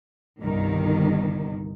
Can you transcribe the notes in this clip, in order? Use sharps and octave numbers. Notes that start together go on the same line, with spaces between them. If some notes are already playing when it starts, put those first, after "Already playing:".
G1 C2 D#3